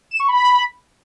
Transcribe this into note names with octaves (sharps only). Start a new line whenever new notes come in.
E7
C#6
B5